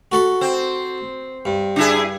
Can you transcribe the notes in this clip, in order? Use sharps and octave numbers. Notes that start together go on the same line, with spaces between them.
F#4 A4 B5
C4
G2
D4 E4 G#4